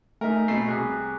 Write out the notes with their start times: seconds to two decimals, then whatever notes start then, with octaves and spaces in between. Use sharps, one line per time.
0.21 A3 D#4 A#4 G#5 A#5 B6
0.48 B2 A3 C7
0.68 C2 G#4 F#6 B6